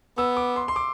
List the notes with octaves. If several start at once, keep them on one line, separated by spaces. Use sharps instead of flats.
B3 E6
D6
C6
C6
D6